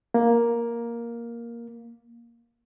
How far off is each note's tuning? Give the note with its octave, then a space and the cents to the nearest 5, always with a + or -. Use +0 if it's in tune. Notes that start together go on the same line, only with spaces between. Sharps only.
A#3 +5